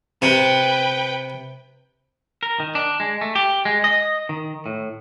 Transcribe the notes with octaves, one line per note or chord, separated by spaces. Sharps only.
C3 B4 G5
A#4
D#3
D4
G#3
A3
G4
G#3
D#5
D#3
A2